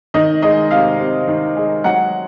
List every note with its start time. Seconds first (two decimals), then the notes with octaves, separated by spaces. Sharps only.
0.14 D#3 D#5
0.42 G#3 D#5
0.71 C3 F5
0.99 C3
1.28 D#3
1.56 G#3
1.84 F#3 F#5